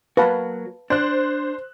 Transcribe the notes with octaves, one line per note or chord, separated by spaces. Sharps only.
F#3 A#3 F#4 B4 F5 A5
D4 C5 F#6